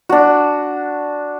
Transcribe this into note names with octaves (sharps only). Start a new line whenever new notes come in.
D4 F#4